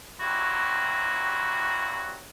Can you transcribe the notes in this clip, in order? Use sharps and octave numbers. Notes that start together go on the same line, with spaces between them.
G2 C3 F#3 E4 F#4